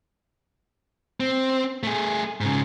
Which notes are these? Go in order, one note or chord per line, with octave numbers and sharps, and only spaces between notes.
C4
A3 G#4
G#2 C#3